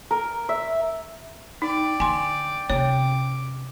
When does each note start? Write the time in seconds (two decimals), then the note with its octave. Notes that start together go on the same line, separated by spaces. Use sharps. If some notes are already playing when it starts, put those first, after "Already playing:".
0.11 A#4
0.49 E5
1.62 D#4 D5 G5 D6
2.00 D3 G#5 C6
2.70 C3 C#4 C#5 D6